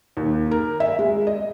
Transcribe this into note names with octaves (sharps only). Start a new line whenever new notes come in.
D#2
A#4
E5
G#3
D#5